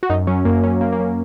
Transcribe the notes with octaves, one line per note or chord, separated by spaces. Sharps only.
F#4
F#2 D#4
F#3 C#4
F#2 A#3
F#3 C#4
F#2 A#3
A#3
F#3 C#4